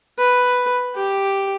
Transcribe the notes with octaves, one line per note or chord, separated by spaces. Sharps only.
B4
G4